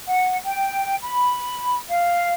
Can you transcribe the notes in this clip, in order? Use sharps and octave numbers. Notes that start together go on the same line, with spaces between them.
F#5
G5
B5
F5